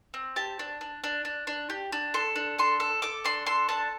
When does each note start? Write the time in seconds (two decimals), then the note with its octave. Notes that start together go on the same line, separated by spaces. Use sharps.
0.14 C4
0.36 G4 A5
0.59 D4
0.81 D4
1.04 D4
1.25 D4
1.47 D4
1.70 G4
1.92 D4
2.14 A4 C6
2.36 D4
2.58 A4 C6
2.80 A4
3.02 A4 D6
3.24 D4 C6
3.46 A4 C6
3.69 D4 A5